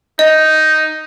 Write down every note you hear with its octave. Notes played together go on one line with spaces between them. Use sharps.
D#4 D#5